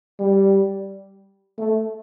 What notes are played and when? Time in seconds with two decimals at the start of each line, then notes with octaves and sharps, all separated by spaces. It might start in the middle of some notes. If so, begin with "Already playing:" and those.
0.20 G3
1.58 A3